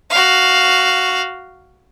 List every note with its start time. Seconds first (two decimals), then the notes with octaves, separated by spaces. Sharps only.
0.11 F#4 F5